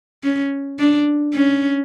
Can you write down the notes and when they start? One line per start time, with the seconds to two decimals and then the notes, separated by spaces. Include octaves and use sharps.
0.23 C#4
0.79 D4
1.34 C#4